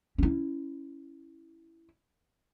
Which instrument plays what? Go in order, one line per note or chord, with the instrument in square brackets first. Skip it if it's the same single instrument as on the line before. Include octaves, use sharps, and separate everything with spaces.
[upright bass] C#4 E4